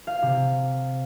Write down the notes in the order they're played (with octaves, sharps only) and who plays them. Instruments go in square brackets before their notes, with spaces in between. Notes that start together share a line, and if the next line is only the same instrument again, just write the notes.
[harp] F5
C3